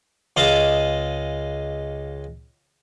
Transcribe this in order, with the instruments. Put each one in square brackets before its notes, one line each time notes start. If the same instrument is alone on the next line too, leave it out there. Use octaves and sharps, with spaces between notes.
[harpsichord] C#2 G#3 D#5 F5 A5 D#6